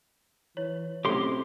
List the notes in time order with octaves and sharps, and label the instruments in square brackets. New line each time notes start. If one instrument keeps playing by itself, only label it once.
[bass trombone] E3 [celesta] C#5
[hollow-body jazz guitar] B1 F#2 A2 [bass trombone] C4 [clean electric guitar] G4 C6 [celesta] A4